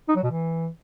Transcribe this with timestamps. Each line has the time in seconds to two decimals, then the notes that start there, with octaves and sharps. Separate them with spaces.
0.09 D#4
0.16 F#3
0.23 B2
0.31 E3